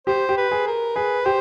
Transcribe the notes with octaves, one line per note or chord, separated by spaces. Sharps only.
G4 C5
G4
B4
G#4
A#4
G#4 B4
G4 C5